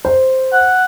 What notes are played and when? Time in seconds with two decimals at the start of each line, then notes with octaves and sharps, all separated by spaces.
0.05 C5
0.52 F#5